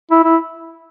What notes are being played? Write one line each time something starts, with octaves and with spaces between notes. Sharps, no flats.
E4
E4